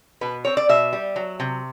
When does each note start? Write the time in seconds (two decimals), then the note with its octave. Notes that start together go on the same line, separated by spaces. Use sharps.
0.21 B2 B4
0.45 C4 C#5
0.57 D5
0.69 B2 E5
0.93 G3
1.16 F#3
1.40 C3